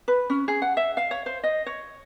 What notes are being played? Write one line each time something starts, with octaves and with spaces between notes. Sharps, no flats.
B4
C#4
G#4
F#5
E5
F5
C#5
C5
D#5
C#5